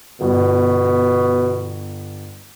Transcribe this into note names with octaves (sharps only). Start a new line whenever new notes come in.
G1 B2